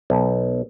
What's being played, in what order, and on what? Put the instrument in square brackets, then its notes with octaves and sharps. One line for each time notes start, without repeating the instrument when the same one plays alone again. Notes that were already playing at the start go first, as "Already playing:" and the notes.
[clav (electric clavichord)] B1